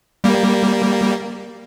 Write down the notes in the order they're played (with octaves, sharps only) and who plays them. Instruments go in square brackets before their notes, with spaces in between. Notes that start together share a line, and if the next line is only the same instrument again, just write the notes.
[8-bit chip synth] G3 A#3